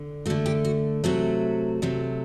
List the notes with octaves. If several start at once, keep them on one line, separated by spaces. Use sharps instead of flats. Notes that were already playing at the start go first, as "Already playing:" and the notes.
Already playing: D3
D3 A3 F#4
G4
F#4
C3 F#3 A3 F#4
C3 F#3 A3